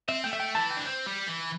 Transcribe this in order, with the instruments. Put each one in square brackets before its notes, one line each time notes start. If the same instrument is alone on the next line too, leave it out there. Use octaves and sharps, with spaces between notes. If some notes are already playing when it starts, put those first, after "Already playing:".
[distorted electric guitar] C4 [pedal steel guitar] E5
[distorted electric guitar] A3 [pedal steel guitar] G5
[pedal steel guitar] E5
G5
[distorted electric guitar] E3 [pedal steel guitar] A5
[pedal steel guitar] G5
[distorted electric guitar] D4
C4
G3
E3